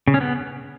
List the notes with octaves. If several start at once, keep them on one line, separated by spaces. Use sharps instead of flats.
C#3
C#4
B3